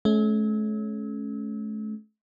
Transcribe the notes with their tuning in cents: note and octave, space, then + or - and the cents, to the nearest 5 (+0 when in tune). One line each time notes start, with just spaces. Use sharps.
A3 -40 C#4 +0